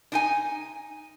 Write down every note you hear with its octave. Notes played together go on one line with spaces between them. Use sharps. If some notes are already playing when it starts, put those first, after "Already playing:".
D4 D#4 G#5